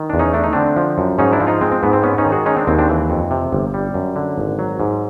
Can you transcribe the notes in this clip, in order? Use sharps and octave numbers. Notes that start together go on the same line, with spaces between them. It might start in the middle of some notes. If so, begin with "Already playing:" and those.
Already playing: D#3
E2 D4
C#4 D#4
A3 D4
D#4
D3 C4 D4
F3
F#2
G#2 C#4 D#4
D4 E4
F3
D#4 F4
G#3 C4
C4
G#2 B3
C4
B3 C#4
C#4 D#4
D#3
F#4 G#4
G#3 C#4 D#4
C4 D4
D#2 C4
C4 D4
E3
F2
C3
G1
G3
F#2
D3
G#1
F#3
G#2